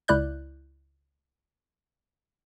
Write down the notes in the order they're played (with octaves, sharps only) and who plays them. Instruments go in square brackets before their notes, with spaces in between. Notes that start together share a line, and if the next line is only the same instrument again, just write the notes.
[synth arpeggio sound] C#2 E4 D5 F#6 G6